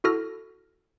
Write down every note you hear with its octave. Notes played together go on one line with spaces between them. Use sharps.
E4 F#4 A4 F6 A#6